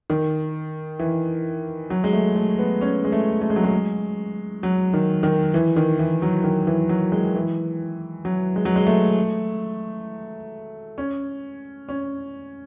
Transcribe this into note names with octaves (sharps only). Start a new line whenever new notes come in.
D#3
E3
F#3
G#3
A3
A3
B3
C#4
G#3
A3
A3
G#3
F#3
G#3
F#3
D#3
D#3
E3
D#3
E3
F#3
D#3
E3
F#3
G#3
E3
F#3
G#3
F#3
G#3
A3
C#4
C#4